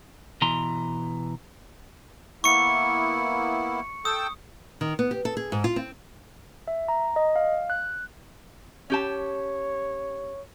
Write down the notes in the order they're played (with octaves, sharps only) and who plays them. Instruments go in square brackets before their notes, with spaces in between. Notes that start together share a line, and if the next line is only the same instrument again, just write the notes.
[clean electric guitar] B2 E3 A#5 C6
[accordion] A#3 B3 E4 [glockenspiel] C#6 C#7
[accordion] A4 G5 E6 [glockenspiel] D#6
[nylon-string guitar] D#3
B3
G4
A4
G#4
G#2
F4
C4
[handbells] E5
A#5
D#5
F5
F#6
[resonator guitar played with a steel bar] C#4 G4 A5 [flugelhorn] C#5